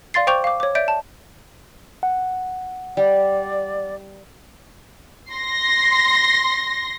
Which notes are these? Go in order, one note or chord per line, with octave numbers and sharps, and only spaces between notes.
D5 F5 C6 A6 C7
C5 G5 C#6 D6 G6 F7
F5 D6
C#5 D6
D5 E5 G6 D7
A5
F#5
G3 D5
C6 A#6